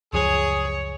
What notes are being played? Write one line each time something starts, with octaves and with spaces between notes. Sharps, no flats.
C#2 F#2 F3 G#4 C#5